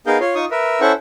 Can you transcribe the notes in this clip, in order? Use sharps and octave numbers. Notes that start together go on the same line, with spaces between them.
B3 D#4 G#4 A#4 F5 G6
F4 C#5 C6
D#4 F4 C#6 D#6
A#4 B4 E5
C#4 E4 A4 C5 F#5 C#6